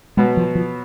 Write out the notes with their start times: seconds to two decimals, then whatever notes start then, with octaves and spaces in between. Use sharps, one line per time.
0.17 B2 F#3 G#3 B3
0.37 F3
0.55 F3